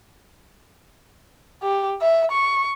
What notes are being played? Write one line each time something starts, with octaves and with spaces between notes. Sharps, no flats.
G4
E5
C#6